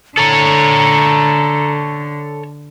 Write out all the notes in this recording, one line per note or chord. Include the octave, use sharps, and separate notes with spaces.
D3 A4 C#5 A#5